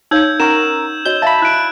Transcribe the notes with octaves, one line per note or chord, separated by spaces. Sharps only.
D#4 C#5 F5 E6 G6 G#6
C#4 A#4 F#5 C#6 E7
F#4 C#5 D#5 G6
E5 F5 A5 B5
E4 F#6 D7